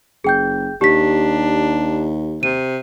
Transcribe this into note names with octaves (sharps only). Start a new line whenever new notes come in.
F#1 G#4 G5 G6
D#2 D4 G4 B6
C3 D#7